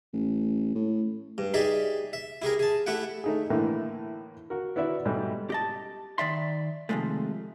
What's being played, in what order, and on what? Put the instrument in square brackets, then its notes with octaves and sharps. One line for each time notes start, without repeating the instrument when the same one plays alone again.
[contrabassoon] A1
A2
[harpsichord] G2
D#4 G4 G#4 D5 E5
E5
E4 G4 G#4 A#4
G#4 A5
A3 E4 G4 F#5 G5
[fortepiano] A3 D#4 G#4
A2 D3 E3 A#3
F#4 A#4
B3 E4 F#4 D5 E5
G#2 B2 G3 A3
[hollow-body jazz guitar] G4 D#5 A5
D#3 D5 E5 C6
C3 D#3 F3 G#3 A3